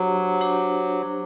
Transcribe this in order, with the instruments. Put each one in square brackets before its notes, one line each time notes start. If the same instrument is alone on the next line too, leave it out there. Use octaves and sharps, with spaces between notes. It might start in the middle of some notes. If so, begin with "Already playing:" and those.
Already playing: [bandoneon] F#3 [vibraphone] D4 G4 C5
[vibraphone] D4 G4 C5